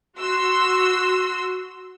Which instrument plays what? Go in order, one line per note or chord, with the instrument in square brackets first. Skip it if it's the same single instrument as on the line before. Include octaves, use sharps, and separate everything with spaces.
[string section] F#4 C6 E6